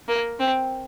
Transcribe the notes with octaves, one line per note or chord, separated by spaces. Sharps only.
A#3
C4